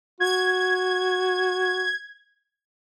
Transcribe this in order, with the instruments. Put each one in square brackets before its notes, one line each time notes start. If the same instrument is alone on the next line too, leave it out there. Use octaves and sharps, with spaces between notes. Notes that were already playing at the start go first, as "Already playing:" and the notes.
[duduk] F#4 [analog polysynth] G#6